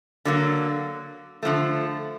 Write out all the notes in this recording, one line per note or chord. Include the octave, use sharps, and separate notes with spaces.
D3 F#3 A#3
D3 F3 A3